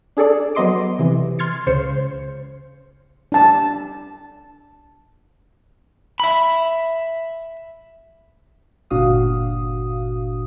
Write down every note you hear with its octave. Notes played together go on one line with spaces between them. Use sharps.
D4 G#4 A4 D5
F#3 B3 D#5 C6 D6 D7
C3 E3
C6 F6 G#6 A6 C#7
C#2 C#3 C5 C#7
D4 A5
E5 B5
G1 A#2 D4 F#4 F5 D#6